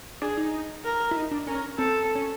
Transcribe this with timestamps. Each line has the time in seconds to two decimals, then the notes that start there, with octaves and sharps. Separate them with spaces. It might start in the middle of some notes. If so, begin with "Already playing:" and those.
0.22 D4 G#4
0.37 D#4
0.84 A#4
1.11 E4
1.16 D#4
1.31 D4
1.47 C#4 A#4
1.78 C4 A4
2.15 C#4